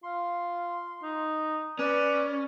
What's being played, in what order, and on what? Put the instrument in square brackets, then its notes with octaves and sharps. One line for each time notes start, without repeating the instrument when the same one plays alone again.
[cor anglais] F4 [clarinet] C6
[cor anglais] D#4
[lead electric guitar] C#4 [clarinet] B4 [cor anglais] D5